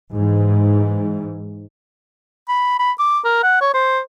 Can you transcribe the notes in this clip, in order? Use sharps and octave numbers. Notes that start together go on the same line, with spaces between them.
G#2 E3
B5
B5
D6
A#4
F#5
C#5
C5